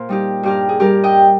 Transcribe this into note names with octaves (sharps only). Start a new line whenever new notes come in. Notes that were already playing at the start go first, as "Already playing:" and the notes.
Already playing: A#2 F4 A#4 C5
G3 D#4 G4
G2 G4 A#4
G#4
G3 G4 A#4
D#5 G5